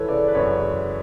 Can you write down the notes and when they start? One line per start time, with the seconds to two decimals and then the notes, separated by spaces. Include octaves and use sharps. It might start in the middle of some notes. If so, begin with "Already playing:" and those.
Already playing: E3 G#3 A4 B4 C#5
0.08 C#3 D5
0.28 B4
0.35 F#2 C#5
0.61 G#3